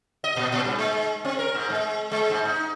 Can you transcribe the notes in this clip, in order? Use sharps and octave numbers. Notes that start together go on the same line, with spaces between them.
D#5
A#2
A#2
G2
G#3
C4
A#4
G#2
G#3
G#3
G#2
D#4